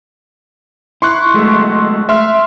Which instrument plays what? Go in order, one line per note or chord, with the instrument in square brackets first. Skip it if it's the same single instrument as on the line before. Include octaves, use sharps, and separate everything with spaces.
[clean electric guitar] E4 [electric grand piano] C6 C#6 F#6
[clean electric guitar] F#3 G#3 A3
[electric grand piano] E5 C6 F6